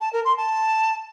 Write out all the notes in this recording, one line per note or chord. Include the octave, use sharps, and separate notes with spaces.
A5
A#4
C6
A5